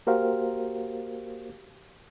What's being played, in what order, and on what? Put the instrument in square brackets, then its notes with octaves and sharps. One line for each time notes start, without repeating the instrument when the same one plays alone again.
[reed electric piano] A#3 F#4 G4 A#4 C5 F5